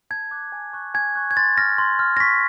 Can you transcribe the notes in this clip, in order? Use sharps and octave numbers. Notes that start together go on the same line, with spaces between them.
A5 G#6
D6 F#6
G#5
C#6 F#6
G#5 G#6
C#6 F#6
G#6
C6 A6
F6 A#6
C6
F6
A#6
C#6 B6